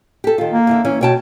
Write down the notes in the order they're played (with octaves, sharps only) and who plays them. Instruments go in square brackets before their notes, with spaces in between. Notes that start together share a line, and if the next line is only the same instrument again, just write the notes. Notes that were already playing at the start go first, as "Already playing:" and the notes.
[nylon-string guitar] G4 A4
D#3 F4
[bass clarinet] A#3
[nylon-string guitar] E2 D3 E5
E3 C#4
[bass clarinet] B2 [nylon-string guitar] C#5 G5 A5